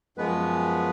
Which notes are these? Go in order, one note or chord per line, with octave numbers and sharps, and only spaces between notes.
F#2 F3 G#3 B3 B4